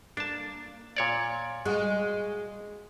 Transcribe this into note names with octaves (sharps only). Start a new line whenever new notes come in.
A#3 D4 A5
A#2 C#5 D5
G#3 F#4